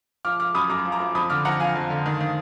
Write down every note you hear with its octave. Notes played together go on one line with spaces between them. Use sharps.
F3 D6 F6
F3 D6 F6
F#2 B5 D#6
F#2 A#5 D6
F3
A#5 D6
F3
F2 B5 D#6
D3 D6 F6
F2 F#5 A#5
F3 F5 G#5
F2
D3
D#3
D#3